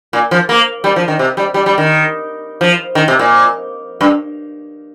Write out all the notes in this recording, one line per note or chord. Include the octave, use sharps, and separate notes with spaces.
A#2
F3
A#3
G3
F3
D#3
C3
G3
G3
G3
D#3
F3
D#3
C3
A#2
G2